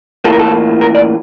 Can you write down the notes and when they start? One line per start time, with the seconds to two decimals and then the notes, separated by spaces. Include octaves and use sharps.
0.24 A2 E3 A#3 F4 A4
0.32 A#4
0.39 A4
0.81 A#4
0.95 D5